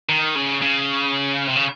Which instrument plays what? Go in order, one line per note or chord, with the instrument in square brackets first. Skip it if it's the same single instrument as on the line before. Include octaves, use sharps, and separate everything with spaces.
[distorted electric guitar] D#3
C#3
C#3
C3
C#3